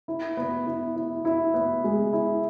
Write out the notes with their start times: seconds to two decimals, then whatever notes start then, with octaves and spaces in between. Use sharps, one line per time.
0.08 E4
0.37 B3
0.66 E4
0.96 E4
1.25 E4
1.54 B3
1.84 G#3
2.13 E4